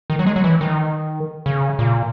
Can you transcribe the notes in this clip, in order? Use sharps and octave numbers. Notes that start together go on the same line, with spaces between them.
D#3
F#3
G#3
F#3
E3
D#3
C#3
A#2